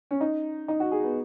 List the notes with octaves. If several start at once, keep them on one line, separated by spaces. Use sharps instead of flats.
C#4
D#4
D#4
F#4
G#4
B3